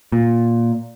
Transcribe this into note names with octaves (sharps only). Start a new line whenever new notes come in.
A#2